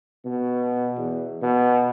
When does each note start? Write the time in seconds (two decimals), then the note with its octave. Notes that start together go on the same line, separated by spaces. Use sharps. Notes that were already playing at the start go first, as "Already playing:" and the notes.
0.25 B2
0.97 E2
1.42 B2